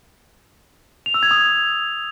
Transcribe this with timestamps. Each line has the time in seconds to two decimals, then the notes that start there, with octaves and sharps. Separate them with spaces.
1.06 F7
1.14 E6
1.23 G#6
1.31 D#6